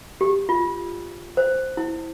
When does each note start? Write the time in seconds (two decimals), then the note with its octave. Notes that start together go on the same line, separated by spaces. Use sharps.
0.21 G4
0.49 F4
1.37 C5
1.77 E4